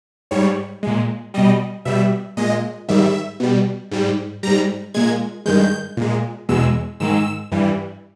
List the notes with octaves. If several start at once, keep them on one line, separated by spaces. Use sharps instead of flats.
G#2 G3 C#5
A#2 G#3
B2 G3 D#5
B2 G3 E5
A#2 G#3 D#5
G#2 D#3 G3 E5
B2 G3
G#2 G3
G#2 G3 A#5
A#2 G#3 G#6
G2 D#3 G#3 G6
A#2 G#3
E2 B2 G#3 E6
G#2 D#3 G#3 E6
G2 E3 G3